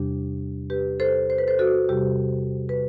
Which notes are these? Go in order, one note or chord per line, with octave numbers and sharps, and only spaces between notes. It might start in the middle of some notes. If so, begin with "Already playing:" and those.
Already playing: E2 C3 G3 D4 G4
G4 B4
A4 C5
C5
B4
A4 C5
F#4 A4
E2 C3 G3 G4
B4